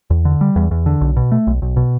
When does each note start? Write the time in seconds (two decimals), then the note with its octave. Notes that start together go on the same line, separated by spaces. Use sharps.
0.10 E2
0.25 D3
0.41 G3
0.56 E2
0.71 E2
0.86 D3
1.01 B1
1.17 B2
1.32 A3
1.47 B1
1.62 B1
1.77 B2